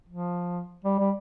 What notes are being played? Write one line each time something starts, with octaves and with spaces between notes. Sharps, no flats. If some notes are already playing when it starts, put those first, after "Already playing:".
F3
G3
G3